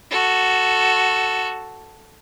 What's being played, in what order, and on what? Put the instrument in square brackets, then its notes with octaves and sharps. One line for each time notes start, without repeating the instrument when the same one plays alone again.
[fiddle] F#4 A4